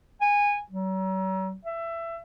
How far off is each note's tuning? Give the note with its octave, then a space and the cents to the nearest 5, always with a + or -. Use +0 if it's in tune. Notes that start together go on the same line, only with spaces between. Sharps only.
G#5 -20
F#3 +40
E5 +20